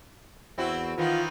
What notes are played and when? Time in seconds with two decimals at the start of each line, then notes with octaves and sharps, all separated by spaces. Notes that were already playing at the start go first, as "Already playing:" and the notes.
0.58 E2 C4 E4 F#4
0.98 D#3 E3 B3 F4